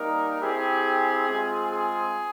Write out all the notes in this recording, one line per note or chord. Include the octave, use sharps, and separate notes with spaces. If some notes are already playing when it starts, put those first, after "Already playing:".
Already playing: G3 A#3 D#4 A#4
C4 E4 G4 G#4
G#3 C4 F4
G#4